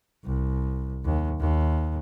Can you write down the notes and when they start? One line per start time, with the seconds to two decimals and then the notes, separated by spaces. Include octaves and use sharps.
0.25 C2
1.05 D#2
1.40 D#2